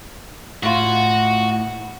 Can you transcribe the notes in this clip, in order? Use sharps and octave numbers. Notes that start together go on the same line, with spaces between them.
A2 F4 F#4